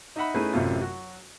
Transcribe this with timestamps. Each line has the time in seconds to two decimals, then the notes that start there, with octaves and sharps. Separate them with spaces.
0.16 D#4 E5 F#5 B5
0.34 A3 C#4 D#4 E4 G#4 B4
0.53 A1 F#2 C3 A3 F4
0.81 F#3 F#4